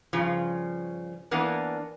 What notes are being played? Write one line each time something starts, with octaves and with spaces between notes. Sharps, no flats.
G2 C#3 F3
E3 A#3 B3 D4